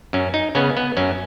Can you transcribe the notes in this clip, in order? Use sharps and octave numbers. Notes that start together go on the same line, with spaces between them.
F#2 C#4
D#4
C#3 B3 C#4
B3
F#2 C#4